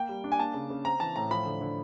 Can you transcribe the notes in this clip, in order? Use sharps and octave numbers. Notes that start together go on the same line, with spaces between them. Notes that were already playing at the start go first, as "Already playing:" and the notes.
Already playing: A#3 G5
G3
D4
G#5
A#3 A5
C#3
C#3
C4 A#5
E3 A5
A2 A#5
F3 B5
D3
D3